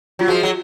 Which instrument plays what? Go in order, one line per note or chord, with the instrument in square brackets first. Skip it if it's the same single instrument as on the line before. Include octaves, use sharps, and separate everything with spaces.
[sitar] F#3 [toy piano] F4
[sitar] F3 G#3 [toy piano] F#4
[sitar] F#3